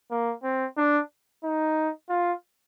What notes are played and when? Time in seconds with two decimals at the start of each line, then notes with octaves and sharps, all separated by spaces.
0.11 A#3
0.43 C4
0.77 D4
1.44 D#4
2.09 F4